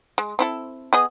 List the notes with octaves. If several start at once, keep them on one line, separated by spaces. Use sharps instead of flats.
G#3
C4 E4 A4
B3 G#4 D#5